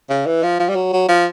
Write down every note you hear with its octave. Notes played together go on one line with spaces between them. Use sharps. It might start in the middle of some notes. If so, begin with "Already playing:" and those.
C#3
E3
F3
F3
G3
F#3
F#3
F3